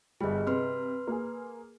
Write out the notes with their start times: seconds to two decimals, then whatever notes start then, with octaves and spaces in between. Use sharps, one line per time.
0.21 G1 G3 G#4 D#5
0.47 C3 B4 C6 F6
1.07 A#3 G#4